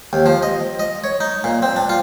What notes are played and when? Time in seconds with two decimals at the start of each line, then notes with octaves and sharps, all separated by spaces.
0.13 D#2
0.26 F3
0.43 D#5
0.79 D#5
1.04 C#5
1.20 D#4
1.44 A#2
1.62 C4
1.76 D4
1.89 F4